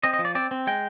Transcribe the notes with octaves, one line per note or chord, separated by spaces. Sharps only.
C4 D#5
D#5
F3
D5
C4 D5
C4
G#3 G5